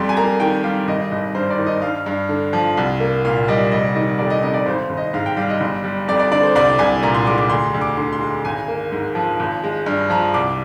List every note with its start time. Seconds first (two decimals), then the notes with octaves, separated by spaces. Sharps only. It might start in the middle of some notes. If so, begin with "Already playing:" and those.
Already playing: F2 G3 C6
0.09 G#5
0.17 A#3 A#5
0.40 D#3 G5
0.63 G3 F5
0.87 G#1 D#5
1.12 G#1 D#5
1.35 G2 C5
1.50 D5
1.59 D#3
1.66 D#5
1.82 G2 F5
2.06 G2
2.29 D3
2.53 F3
2.77 C2
3.00 A#3
3.25 A#2 F5
3.48 G3 D#5
3.72 F1 D#5
3.95 D#3 D#5
4.19 F2 D5
4.30 D#5
4.43 C3 D#5
4.54 D5
4.66 G#1 C5
4.89 G#1
4.97 D#5
5.14 G#2 F5
5.26 G5
5.37 G3 F5
5.49 D#5
5.61 G1
5.84 G3
6.08 F2 D5
6.19 D5
6.31 D3 D5
6.43 C5
6.55 C2 D5
6.79 C2 G#5
7.03 A#2 A#5
7.14 C6
7.27 G#3 D6
7.38 D6
7.49 D2 C6
7.74 D2
7.81 D6
7.97 D3 C6
8.13 C6
8.20 G#3
8.45 G#1 G#5
8.68 A#3
8.92 G#2
9.15 F3
9.40 G#1
9.64 G#3
9.86 G2
10.10 F3 A#5
10.34 C2 D6